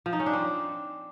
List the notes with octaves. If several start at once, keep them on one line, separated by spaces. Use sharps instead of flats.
F3
D#4
C#4
D4
C4